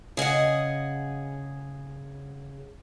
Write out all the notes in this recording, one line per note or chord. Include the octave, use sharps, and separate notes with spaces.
C#3 G#4 D#5 F#5